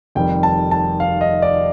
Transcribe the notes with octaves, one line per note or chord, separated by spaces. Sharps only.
F1 F2 D#3 G3 G5
A5
A5
F5
D#5
D5